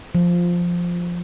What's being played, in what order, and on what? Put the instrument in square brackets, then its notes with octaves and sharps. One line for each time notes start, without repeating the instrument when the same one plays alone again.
[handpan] F3